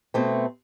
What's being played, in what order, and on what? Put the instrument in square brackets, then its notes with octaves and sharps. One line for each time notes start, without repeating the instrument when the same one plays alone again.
[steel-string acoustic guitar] B2 A3 C4